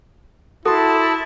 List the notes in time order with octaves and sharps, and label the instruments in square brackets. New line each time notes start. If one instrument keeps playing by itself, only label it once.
[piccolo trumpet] E4 [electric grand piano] F#4 C6 [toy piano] A4 [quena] A5